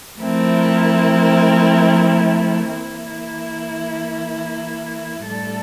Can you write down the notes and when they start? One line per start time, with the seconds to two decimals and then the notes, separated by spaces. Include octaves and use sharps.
0.19 F3 A3 C4 E4 A#4
2.71 E3 A#3 E4
5.26 A2 G3 D4 A4 D5